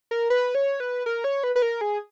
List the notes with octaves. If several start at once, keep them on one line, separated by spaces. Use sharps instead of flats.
A#4
B4
C#5
B4
A#4
C#5
B4
B4
A#4
G#4